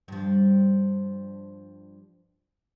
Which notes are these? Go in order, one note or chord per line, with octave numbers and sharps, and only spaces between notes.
G2 F3